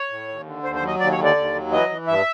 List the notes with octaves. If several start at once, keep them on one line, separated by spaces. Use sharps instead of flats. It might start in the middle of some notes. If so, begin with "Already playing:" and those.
Already playing: C#5
A2
D#2
D3
D#2 C5
C5
F#3
D#5
D#2 D5
C#5
D3
D5
D#2
F#3
E3 D#5
E3
G2 E5